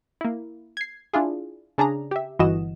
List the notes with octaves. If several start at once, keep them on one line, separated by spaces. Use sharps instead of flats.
A#3 E4
G#6 C7
D4 E4 F4 G#4
C#3 D4 G#4 A#5
G4 E5
G1 E3 F#4 D#5 E7